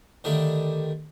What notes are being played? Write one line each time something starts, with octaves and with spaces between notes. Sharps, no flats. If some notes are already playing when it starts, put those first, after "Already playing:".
D3 D#3 G3 A3